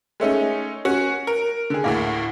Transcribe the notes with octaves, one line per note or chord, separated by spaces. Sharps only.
G#3 A3 C#4 D#4
C#4 F#4
A#4
D3 G#4
D2 A2 A#3